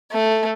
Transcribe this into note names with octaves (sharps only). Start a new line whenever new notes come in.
A3